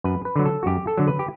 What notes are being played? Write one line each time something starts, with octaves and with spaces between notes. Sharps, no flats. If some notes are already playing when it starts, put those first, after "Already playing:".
F#2 B4
B4
D3 F#3
A4
F#4
F#2 G4
A4
D3 F#3
B4
G4